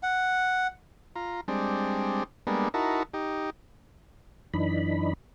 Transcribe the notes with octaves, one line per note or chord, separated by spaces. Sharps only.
F#5
F4 A#5
G3 G#3 C4 D4
G3 G#3 A#3 B3 D4
D#4 E4 F#4 A#4 A5
D#4 G4
F#2 E3 D4 D#4 B5